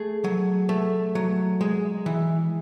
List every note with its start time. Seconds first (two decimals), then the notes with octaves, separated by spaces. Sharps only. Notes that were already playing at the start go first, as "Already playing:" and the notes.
Already playing: A3 G#4
0.24 F#3
0.69 A3
1.15 F#3
1.61 G#3
2.06 E3